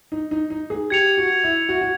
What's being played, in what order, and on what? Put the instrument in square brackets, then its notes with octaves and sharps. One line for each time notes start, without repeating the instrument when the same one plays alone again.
[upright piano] D#4
D#4
D#4
G#4
[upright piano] G4 [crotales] G#6 C#7 F7
[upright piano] F#4
E4
F#4
F#4